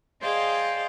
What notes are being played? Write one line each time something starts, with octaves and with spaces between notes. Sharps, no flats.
G#4 C5 D5 D#5 F5 G5